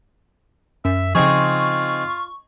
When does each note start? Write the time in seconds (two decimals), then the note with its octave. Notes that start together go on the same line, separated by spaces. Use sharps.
0.85 F#2 E5
1.15 C#3 F3 C4 D#4 F4 G#4 C#6